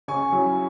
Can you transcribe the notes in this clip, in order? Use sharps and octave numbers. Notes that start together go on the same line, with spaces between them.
C#3 G#5 C#6
F#3 C#4 E4